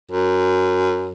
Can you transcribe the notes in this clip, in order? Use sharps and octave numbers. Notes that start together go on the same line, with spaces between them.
F#2